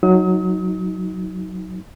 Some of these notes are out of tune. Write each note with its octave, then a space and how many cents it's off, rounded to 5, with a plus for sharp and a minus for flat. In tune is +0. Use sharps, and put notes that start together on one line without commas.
F#3 +0 D#4 +25 D#6 +40